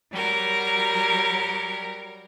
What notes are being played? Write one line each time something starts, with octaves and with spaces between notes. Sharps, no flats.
F#3 G3 A#4